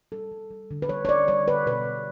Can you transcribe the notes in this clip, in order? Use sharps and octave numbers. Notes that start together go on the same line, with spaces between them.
G3 A4
G3
G3
D3
B4
G3 C#5
C#5
G3 D5
G3 C#5
D3 B4
B2 B4
G3